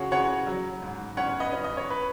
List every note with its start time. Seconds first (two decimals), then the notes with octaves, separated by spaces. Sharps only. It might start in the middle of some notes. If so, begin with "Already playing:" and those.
Already playing: C#3 F#4 G#4 C#5
0.12 C#3 C#5 F#5
0.47 F#3
0.82 G#2
1.17 C#4 C#5 F#5
1.40 B4 D#5
1.53 C#4
1.64 D#5
1.77 C#5
1.90 B4